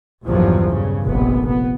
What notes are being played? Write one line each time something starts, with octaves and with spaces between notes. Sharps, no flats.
A#1 E2 G2 A#2 F3 F#3
G2 C#3
F1 A#1 B3
B3